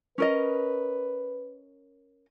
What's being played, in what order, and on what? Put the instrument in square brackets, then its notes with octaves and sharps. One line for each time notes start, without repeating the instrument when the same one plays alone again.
[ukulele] C#4 A#4 D#5 [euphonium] B4